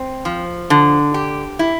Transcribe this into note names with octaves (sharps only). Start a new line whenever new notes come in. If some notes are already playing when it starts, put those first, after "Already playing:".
Already playing: C4
F3
D3
G4
E4